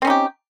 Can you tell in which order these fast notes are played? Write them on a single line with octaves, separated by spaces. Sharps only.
C4 C#4 D#4 G4